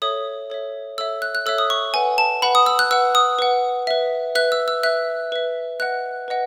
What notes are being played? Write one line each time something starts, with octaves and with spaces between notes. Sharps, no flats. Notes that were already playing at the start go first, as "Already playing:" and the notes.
A4 C#5 E5 D#6
A4 C#5 E5
A4 C#5 E5 E6
F#6
F#6
A4 C#5 E5 E6
D#6
C#6
B4 F#5 G#5
A5
B4 F#5 B5
D#6
E6
F#6
B4 F#5 E6
D#6
B4 F#5
B4 E5
B4 E5 F#6
E6
E6
B4 E5 F#6
B4 E5
B4 D#5 F#5 F#6
B4 D#5 F#5